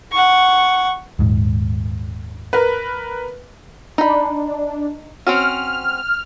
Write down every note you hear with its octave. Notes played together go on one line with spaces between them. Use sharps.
F#5 C#6
D#1 G#2
A#4 B4
D4 D#4 B5
C4 C#4 F#4 F6